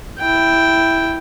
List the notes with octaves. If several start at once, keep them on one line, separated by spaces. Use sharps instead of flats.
E4 G5